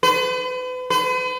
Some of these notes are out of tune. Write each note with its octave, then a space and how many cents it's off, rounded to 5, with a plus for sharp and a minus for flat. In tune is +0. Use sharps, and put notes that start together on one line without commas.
B4 +40
B4 +45